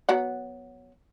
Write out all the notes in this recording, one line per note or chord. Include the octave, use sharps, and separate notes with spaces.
F#3 B3 F#5